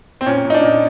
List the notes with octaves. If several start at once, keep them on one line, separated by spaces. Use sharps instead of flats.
C4
A#2 C#4
A#2
D#4
D4
A#2